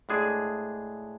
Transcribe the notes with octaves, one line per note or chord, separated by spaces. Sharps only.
A2 G#3 D4 G#4